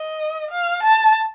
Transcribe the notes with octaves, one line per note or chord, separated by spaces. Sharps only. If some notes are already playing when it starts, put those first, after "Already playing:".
Already playing: D#5
F5
A5